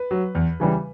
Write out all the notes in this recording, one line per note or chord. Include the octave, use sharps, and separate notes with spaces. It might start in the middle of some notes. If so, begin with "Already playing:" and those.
Already playing: B4
F#3
E2
C#3 E3 G3